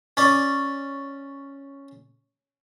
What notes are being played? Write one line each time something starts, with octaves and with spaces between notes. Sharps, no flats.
C#4 D5